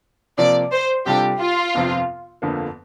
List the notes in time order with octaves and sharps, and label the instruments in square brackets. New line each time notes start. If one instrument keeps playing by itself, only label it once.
[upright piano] C3 F3 A#3 [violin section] D5
[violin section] C5
[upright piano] C3 G3 D4 F4 A4 [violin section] G4
[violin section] F4
[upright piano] G1 F2 C3 F3 C4
G1 F2 D3 F3 A#3